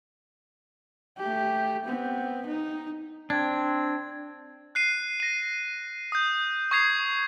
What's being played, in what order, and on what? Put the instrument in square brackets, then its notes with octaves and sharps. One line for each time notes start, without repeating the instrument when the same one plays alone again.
[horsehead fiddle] A3 G4
B3 C4
D#4
[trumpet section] C4 [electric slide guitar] D4 [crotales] G#6
[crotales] F#6 C7 D#7
A#6 D#7
D#6 G6
C#6 D#6 G#6 C7 F7